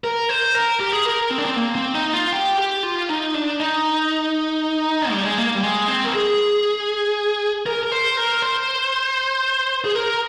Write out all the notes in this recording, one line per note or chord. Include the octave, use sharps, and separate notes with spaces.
A#4
C5
A#4
G4
G#4
A#4
C4
D4
C4
A#3
C4
D#4
F4
G4
G4
F4
D#4
D4
D#4
G3
G#3
A#3
G3
G#3
C4
A#4
G#4
A#4
A#4
C5
A#4
C5
G#4
A#4